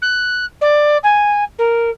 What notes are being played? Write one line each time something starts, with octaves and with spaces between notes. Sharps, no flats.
F#6
D5
G#5
A#4